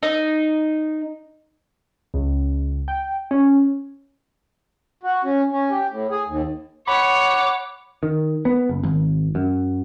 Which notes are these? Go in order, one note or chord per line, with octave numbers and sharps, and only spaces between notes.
D#4
C#2
G5
C#4
F#4
C#4
C#4
G4
A2
G#4
D#2
C#5 F#5 B5 D6
D#3
B3
F#1
G#1
F#2